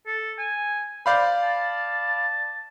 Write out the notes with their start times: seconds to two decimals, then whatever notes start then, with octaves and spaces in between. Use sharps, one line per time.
0.06 A4
0.39 G#5
1.06 C5 D5 F5 B5
1.43 A5